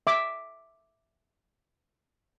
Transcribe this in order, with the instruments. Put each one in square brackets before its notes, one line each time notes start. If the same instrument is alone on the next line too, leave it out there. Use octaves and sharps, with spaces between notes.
[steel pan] E5 D6